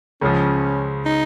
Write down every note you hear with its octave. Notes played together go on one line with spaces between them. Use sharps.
C#2 C#3 F3 C#4
D#4